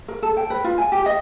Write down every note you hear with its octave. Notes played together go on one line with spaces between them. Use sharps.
A#4
A4
G5
B4
F4
G#5
G4
D#5